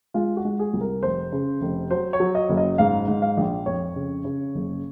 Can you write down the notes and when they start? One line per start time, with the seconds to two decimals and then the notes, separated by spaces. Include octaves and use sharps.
0.14 G#3 F4
0.37 F#4
0.45 G#3
0.59 G#4
0.73 C2
0.81 A#4
1.03 F1 C5
1.32 C#3
1.61 F1
1.91 F#3 C5
2.13 C#5
2.20 F#3
2.35 D#5
2.49 F#1
2.57 D#5
2.78 G#2 F5
3.08 G#2
3.22 F5
3.37 A#1
3.66 F2 C#5
3.96 C#3
4.25 C#3
4.55 F#1